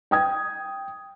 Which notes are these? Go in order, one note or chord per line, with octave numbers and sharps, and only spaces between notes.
G5 D#6 G#6